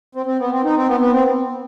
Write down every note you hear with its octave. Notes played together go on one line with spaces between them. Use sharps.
C4
C4
B3
C4
D#4
C4
B3
B3
C4